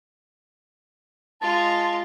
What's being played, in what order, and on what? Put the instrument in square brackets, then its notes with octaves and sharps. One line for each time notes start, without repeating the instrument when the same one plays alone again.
[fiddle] G#3 F4 [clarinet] A5